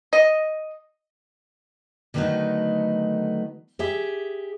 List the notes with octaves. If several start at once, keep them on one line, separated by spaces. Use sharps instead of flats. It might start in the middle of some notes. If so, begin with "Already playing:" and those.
D#5
D3 D#3 F#3 A3 B3 D#4
G4 G#4 E5